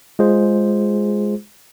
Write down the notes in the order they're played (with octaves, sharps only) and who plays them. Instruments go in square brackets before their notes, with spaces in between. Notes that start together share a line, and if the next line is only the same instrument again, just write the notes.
[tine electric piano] G#3 F4 G#4 C5